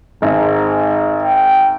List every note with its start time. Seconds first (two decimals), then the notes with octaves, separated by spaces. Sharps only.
0.22 G#1 G#2
1.23 G5